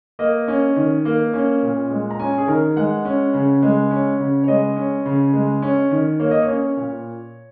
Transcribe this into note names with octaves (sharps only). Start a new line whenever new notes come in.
A#3 D#5
C#4
D#3
A#3
C#4
A#2
G#3
A#5
C#4 G#5
G#4
D#3 A#4
G#3 F#5
C#4
C#3
G#3
C#4
C#3
C#5
G#3 D#5
C#4
C#3
G#3
C#4
D#3
A#3 C#5
D#5
C#5
C#4
A#2